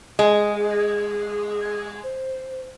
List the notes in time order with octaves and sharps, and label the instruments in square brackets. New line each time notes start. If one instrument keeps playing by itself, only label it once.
[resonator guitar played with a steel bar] G#3 [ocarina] G#4
[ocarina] C5